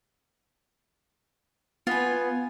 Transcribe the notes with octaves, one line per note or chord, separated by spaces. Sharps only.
B3 F4 G#5